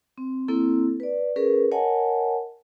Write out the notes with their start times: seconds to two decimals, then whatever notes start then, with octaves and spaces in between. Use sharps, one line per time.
0.18 C4
0.48 A#3 C4 E4 A4
1.00 B4 D5
1.36 C#4 G#4 A#4 B4
1.71 A#4 C#5 D#5 F#5 G#5 A5